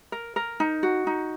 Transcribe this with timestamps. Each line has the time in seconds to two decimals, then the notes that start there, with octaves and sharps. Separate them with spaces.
0.12 A#4
0.36 A#4
0.60 D#4
0.83 F#4
1.07 D#4